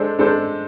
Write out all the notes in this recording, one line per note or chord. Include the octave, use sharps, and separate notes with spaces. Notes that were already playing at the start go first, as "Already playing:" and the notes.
Already playing: G#3 D4 A4 C5
G#3 D4 A4 C5